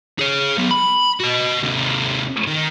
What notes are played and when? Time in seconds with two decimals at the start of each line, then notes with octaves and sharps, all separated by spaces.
0.19 G#4 C#5
0.57 F#3 B3
0.71 B5
1.20 F#4 D#5
1.63 D#2 C3
2.47 D#3